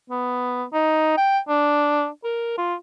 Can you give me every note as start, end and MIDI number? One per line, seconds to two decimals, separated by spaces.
0.10 0.64 59
0.73 1.17 63
1.17 1.39 79
1.49 2.08 62
2.24 2.54 70
2.58 2.75 65